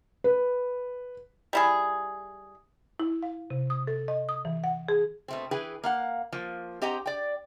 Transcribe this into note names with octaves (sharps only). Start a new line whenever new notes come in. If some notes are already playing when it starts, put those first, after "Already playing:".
B4
G3 E4 G#4
E4
F5
C3
D#6
A4
D#5
D#6
E3
F#5
G#4
B2 A3 C4
E3 G#4 B4 G5
A#3 F5 F#5
F3 A#3
C4 G4 D#5 F#5 G5 A#5
D5 G5